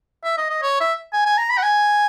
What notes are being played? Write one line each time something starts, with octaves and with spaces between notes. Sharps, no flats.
E5
D#5
D#5
C#5
E5
G#5
G#5
A#5
B5
F#5
G#5